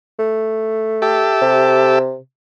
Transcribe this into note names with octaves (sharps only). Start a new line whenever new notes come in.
A3
G4 A4 E5
C3